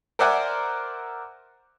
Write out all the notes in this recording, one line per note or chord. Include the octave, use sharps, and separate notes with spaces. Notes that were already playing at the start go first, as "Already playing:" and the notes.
A#4 C5 D5 E5 F#5 G#5